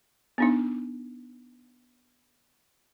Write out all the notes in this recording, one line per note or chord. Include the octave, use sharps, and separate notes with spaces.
B3 D4 D#4